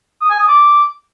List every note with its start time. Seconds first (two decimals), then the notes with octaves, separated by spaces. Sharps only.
0.21 D#6
0.30 G#5
0.39 D#6
0.48 D6